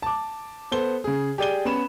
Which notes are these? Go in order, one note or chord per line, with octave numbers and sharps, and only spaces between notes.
A5 D6
B3 A4 C5 G7
C#3 G#4
G4 G#4 D5 D#7 G7
B3 C#4 B5 E7